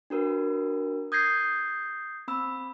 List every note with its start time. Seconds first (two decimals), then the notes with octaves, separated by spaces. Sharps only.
0.10 D4 F#4 A#4 B4
1.12 D#6 G6 G#6 A#6 C7
2.28 C4 B5 E6